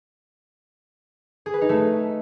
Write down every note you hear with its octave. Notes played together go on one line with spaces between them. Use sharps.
G#4
B4
D#4
A3